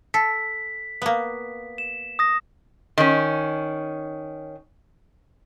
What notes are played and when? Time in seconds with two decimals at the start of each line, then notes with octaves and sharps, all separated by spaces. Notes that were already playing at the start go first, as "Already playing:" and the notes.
0.14 A4 B6
1.02 A#3 B3
1.78 E7
2.19 D#6 A#6
2.98 D#3 C#4